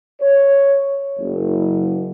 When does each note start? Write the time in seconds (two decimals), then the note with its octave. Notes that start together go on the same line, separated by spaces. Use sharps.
0.21 C#5
1.19 F#1